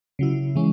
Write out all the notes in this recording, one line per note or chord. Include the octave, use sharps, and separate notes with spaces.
C#3 F#3 E4
E3 G#3 C#4